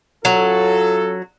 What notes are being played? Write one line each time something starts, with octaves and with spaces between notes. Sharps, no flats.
F#3 C#4 F4 A4